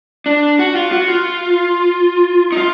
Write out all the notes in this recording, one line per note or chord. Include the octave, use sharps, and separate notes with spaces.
D4
F#4
F4
F#4
F4
D#4
F4